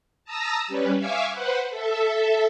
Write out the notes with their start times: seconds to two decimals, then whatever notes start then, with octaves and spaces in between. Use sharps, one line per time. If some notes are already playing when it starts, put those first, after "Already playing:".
0.25 A5 A#5 D#6 E6 A#6
0.68 G3 C#4 B4
0.98 E5 F5 G#5 C#6 D6 E6
1.32 B4 C5 F#5
1.70 A4 E5